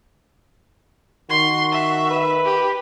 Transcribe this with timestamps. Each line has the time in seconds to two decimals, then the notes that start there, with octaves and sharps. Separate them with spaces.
1.30 D#3 F#4 C6
1.72 E5
2.10 B4
2.46 G4